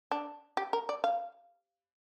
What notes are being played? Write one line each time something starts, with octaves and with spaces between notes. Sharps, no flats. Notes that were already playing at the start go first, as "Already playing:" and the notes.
D4
G4
A#4
D5
F5